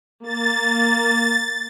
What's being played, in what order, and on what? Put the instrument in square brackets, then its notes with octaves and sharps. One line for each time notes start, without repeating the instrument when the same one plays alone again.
[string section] A#3 [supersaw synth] A6